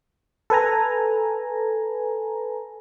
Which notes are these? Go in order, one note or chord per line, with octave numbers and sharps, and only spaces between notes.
A4 B4 G#5 A#5